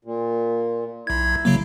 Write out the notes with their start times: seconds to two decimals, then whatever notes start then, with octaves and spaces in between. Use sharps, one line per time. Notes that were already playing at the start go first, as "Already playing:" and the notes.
0.05 A#2
1.07 B1 E4 G#6
1.45 C#3 F#3 A#3